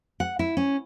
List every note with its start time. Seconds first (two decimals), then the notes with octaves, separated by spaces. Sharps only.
0.20 F#5
0.39 E4
0.57 C#4